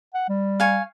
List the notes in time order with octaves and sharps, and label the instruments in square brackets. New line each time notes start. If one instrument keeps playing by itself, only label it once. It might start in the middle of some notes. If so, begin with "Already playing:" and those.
[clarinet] F#5
G3
[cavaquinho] F5 G#5 C#6